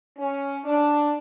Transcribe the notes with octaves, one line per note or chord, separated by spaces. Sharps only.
C#4
D4